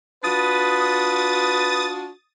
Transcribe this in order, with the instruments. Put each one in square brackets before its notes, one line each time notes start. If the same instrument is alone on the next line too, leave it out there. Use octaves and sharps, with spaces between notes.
[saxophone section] D4 F4 F#4 [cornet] B4 [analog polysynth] D#6 A6